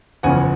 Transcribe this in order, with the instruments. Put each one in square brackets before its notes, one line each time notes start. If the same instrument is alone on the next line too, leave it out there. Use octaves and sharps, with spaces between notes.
[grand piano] F#1 E2 C#3 F3 F#5 G#5